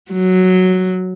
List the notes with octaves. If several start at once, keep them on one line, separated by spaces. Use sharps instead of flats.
F#3